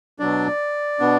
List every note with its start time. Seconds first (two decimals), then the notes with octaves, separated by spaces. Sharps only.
0.19 B2 F#3 D4 D5
0.99 B2 B3 D4